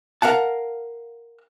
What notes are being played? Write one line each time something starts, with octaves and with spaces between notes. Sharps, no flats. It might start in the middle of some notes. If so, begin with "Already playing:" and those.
A#4 F5 F#5 A5